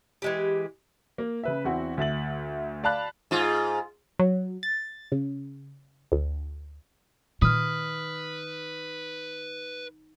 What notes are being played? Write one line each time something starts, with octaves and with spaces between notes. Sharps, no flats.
E3 G#3 G4
A#3
C#3 B4 E5
E2 C4 E4 F#4
D2 E5 A6 F#7
D5 F5 A5 B5 F#6
G#2 F4
F#3
A6
C#3
D2
A#2 D#3 B4 D#6 F6